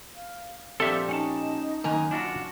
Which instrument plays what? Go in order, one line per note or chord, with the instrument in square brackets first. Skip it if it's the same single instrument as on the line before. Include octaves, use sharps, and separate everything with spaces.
[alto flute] F5
[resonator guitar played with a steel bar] A#2 F3 G4 [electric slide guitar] C4 [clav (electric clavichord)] A4 E5 [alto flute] D5
[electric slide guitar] C#4 F#5 A5 [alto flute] D#4
[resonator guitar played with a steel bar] F#2 G#5 A#5 [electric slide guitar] D#3 A#3
[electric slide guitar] D4 F4 F#4